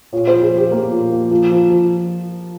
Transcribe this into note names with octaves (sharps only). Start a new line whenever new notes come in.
A#2 C#5
C5
F3
G#4
A#2
G4
F3 A#3
A#2
F3
F3
F3
F3